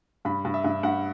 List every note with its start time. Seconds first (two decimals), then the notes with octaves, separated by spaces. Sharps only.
0.25 G2 B5
0.45 G2
0.54 E5
0.64 G2
0.83 G2 F#5